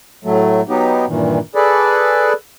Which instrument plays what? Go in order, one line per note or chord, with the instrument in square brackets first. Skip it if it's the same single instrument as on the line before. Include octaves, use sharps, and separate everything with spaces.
[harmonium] A2 F#3 A3
F#3 B3 D#4 G4
G2 A#2 D#3 E3
G#4 A4 B4 D5